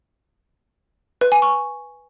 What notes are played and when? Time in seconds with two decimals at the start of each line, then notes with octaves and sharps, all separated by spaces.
1.21 B4
1.32 G#5
1.42 C#6